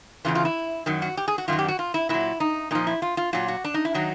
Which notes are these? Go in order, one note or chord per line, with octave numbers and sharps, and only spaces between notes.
E2 C#3 E3 F4
F4
E4
F#2 D#3 F#3
F#4
G4
G#4
F#4
F#2 D#3 F#3 F4
G4
F#4
F4
E4
A#2 F#3 E4
D#4
A#2 F3 D#4
E4
F4
F4
A#2 F#3 F4
F#4
D4
D#4
E4
D#3 F#3 D#4